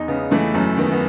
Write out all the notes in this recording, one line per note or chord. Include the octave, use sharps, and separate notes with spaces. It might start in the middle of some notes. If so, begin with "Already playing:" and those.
Already playing: E2 D#4
C#3 B3
E3 A3
F#2 A3
D#3 B3
B3